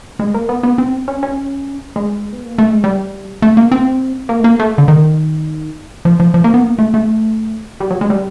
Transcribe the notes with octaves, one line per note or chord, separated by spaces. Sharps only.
G#3
A#3
B3
B3
C4
C#4
C#4
G#3
B3
A#3
A3
G#3
G3
A3
A#3
C4
A#3
A3
A#3
A3
D3
D#3
F3
F3
F3
A#3
B3
A#3
A3
A3
G3
F#3
G#3
G3